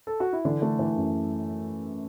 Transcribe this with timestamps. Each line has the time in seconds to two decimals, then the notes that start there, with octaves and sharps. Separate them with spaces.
0.07 A4
0.20 F#4
0.33 E4
0.45 D3 E3 D4
0.62 A3
0.79 E3
0.97 F#2